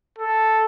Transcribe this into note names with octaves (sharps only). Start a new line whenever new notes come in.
A4